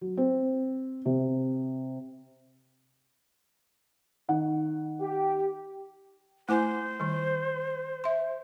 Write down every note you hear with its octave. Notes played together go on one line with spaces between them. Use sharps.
F#3
C4
C3
D#3 F#5
G4
A3 E4 C5 G#5
D#3 G3
E5 C6